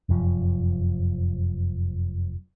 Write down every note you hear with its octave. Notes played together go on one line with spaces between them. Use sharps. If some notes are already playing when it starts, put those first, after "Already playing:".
F1 F#2 F3